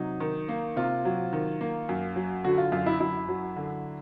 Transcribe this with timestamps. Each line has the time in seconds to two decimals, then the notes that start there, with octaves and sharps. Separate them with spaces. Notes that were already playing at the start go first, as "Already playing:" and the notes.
Already playing: C3 F#3 D#4
0.20 D#3
0.49 A#3
0.76 C3 F4
1.05 F#3
1.33 D#3
1.61 A#3
1.89 F#2
2.16 F#3
2.44 D3 F#4
2.58 F4
2.72 F#2 F4
2.86 E4
3.00 F#2 E4
3.29 F#3
3.56 D3